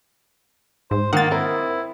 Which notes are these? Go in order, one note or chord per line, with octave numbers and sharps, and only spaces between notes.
G#2 C5
D#3 A#3 F#5 A6
C4 E4 A#4